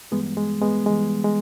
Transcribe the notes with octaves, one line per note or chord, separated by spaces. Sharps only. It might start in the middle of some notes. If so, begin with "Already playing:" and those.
G2 E3 G3 G#3 B3
G#3
G#3 B3
G2 E3 G3 G#3
G#3